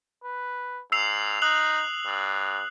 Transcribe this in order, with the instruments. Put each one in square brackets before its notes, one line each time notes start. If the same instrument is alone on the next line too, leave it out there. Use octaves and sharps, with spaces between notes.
[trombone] B4
[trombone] G#2 [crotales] E6 C7 F7
[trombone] D#4 [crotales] D#6 F#6 F#7
[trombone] G2